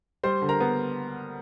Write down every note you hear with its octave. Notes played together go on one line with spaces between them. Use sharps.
G3 C5 C6
D3
A#4 A#5
B3